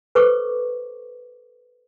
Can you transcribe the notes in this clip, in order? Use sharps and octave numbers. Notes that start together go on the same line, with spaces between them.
A4 B4 C5 C#6 D6